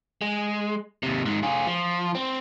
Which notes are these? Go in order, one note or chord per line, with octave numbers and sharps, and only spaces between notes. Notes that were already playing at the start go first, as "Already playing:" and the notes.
G#3
D#2 C3
G#2 D#3
F4 G#4
F3
C4